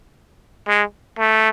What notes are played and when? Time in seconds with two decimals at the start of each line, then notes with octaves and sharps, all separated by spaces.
0.68 G#3
1.19 A3